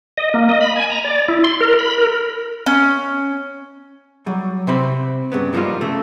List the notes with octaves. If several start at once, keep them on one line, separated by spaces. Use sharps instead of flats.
D#5
A#3
D#5
B5
G#5
A#5
D5
E4
C6
A#4
B5
A#4
C#4
F#3 G3
C3 C4 C5 B5
G2 C#3 B3
G2 F3 G3 A#3 D#4 F4
C#3 A3